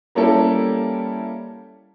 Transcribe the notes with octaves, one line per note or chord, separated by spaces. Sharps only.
G3 A#3 C#4 E4 G4 A4